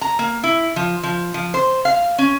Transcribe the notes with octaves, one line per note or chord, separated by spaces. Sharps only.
A#5
A#3
E4
F3
F3
F3
C5
F5
C#4